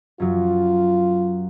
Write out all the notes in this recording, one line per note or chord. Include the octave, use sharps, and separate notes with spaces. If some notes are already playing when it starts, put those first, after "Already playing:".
F#2 F#3 F4